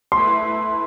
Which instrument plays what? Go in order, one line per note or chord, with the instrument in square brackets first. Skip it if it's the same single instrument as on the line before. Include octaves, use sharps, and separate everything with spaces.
[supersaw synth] A3 E4 B4 [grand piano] C6